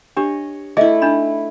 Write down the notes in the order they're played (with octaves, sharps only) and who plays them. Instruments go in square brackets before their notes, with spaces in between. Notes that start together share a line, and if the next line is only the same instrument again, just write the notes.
[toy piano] D4 G4 [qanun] C#5 D#5
[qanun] A3 E4 [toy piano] G#4 D#5 E5
[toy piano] D4 D#4 B5